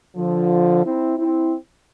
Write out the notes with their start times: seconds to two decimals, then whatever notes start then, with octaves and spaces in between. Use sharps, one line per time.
0.16 D3 F3
0.84 C4 E4
1.18 C4 E4